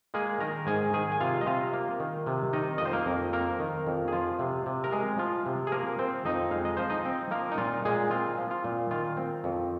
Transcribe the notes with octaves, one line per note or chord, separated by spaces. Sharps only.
G#3 A#3 G#4
D#3 A#4 A#5
G#2 G#4 G#5
D#3 G#4 G#5
G#5
C3 F4 F5
D#5
C3 F4 F5
A#3
D#3
C3
D#3 D#4 D#5
F2 D#5
C5
A#3 A#4
F2
A#3 C4 A#4
D#3
F2
G#4
F3 F4
C3
C3
A#4
G#3 G#4
F3 F4
C3
G#4
F3 A#3 A#4
C4 C5
F2 D#4 D#5
G#3 F5
D#5
F3 C5
D#4 D#5
C4
F3 A#3 A#4
D#4
A#2 F4
A#2 G#3 G#4
C4 F4
F3
F4
A#2
D#3 F4
C4
F2